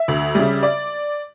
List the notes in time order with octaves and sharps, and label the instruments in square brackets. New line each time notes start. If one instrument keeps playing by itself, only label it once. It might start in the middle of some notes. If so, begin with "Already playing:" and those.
Already playing: [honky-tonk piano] E5
D2
C#3 G3
D5